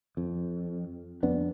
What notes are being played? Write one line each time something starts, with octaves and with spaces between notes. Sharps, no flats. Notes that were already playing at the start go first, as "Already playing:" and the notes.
F2
F2 B3 D4